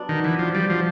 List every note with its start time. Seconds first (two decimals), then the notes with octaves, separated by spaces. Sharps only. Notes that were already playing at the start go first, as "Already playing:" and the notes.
Already playing: F#3 B3 D4
0.09 D#3
0.24 E3
0.39 F3
0.55 G3
0.70 F3